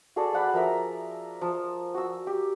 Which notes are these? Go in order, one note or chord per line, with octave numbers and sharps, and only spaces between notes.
F#4 G#4 A4 D5
D5 F#5 B5
F3 A#4 E5 A#5
F3
F#4 E6
G4